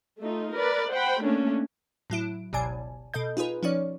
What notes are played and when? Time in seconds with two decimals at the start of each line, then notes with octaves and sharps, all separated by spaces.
0.19 A3 D#4 F4
0.53 A#4 B4 D5
0.91 C5 F#5 G5 B5
1.21 A3 A#3 C#4 D4
2.10 A2 F#3 E4 D7
2.53 G1 C#2 B2 D5 G#5 A5
3.14 B2 A4 D#5 G6
3.37 D#4 F4 G#4 B4
3.63 F3 C#4 D#4 C#5 D5